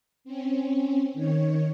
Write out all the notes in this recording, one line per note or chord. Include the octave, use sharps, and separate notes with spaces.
C4 C#4
D#3 C#5